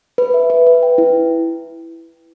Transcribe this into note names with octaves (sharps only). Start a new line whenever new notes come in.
B4
E5
B4
B4
G5
E4